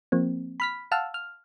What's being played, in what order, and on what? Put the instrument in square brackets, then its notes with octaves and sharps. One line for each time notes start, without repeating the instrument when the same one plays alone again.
[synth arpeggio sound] F3 A#3 C4
B5 F6 B6
F5 F#5 A5 E6 F6
F6